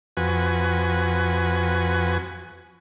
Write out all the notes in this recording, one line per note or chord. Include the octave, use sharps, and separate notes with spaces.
F2 F#4 B4 G#5